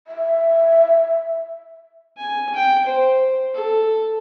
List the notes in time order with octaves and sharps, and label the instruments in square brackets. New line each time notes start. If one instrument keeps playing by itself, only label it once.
[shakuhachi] E5
[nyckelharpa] G#5
G5
C5
A4